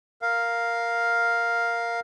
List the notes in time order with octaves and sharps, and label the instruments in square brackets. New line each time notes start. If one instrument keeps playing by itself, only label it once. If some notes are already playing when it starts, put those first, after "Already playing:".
[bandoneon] A#4 F5